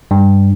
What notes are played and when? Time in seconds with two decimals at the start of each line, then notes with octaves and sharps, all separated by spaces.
0.11 G2